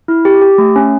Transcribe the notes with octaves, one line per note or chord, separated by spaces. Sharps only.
E4
G4
G4
A3
C#4